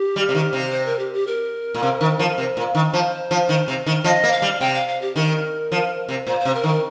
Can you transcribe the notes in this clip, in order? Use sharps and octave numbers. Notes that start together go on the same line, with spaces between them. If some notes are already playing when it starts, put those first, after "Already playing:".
Already playing: G4
G3
C3
D#3
C3
C5
A#4
G4
G4
A#4
A#2
C3
D#3
F3
C3
A#2
D#3
F3 C5
F3
D#3
C3
D#3
F3 D#5
A#3
F5
G3
C3 G5
F5
F5
G4
D#3 A#4
F3
C3
A#2 C5
C3 C5
A#4
D#3
A#4